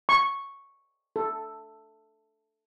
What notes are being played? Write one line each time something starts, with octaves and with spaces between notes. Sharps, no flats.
C#6
A4